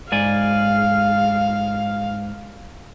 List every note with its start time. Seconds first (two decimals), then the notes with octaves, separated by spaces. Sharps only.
0.12 G#2 D5 F5 G#5